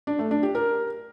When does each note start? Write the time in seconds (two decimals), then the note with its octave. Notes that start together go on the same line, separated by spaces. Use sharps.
0.07 D4
0.19 A3
0.31 D4
0.43 G4
0.55 A#4